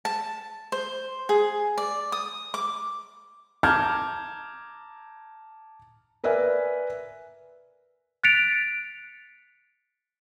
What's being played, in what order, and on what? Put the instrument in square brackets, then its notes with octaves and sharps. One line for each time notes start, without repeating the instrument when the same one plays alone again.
[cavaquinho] A5
C5
G#4
D5
D#6
D6
[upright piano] A5 A#5 D6 F6 G6 G#6
[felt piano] A#4 B4 D5 E5 G#5
[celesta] F#6 A6 B6 C#7 D7 F7